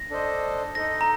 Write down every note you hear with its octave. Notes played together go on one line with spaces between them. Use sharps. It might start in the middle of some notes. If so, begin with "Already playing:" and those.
Already playing: A#6
D4 A4 C5 D#5
D#4 A4 D#5 A#6
A#5